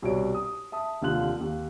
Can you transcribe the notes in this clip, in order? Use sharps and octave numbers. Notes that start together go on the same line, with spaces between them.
C2 B2 C#5 D7
D#6
E5 A5 D#6
F1 D#2 D3 F4 F#6 F#7
D#2